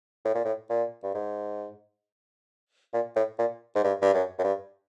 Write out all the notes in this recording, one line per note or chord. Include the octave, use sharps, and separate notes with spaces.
A2
A#2
A2
A#2
G2
G#2
A#2
A2
A#2
G#2
G2
G2
F#2
F#2
G2